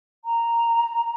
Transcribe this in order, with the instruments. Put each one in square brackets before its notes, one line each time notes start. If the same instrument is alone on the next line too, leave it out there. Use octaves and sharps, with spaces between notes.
[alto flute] A#5